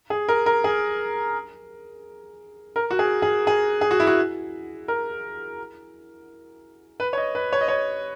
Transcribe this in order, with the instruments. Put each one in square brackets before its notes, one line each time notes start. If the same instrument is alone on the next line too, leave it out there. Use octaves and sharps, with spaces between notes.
[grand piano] G#4
A#4
A#4
G#4
A#4
F#4
G#4
G#4
G#4
G#4
F#4
E4
F#4
A#4
B4
C#5
D#5
B4
C#5
D#5
C#5